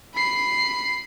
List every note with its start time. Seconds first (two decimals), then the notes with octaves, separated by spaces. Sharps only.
0.14 B5 C7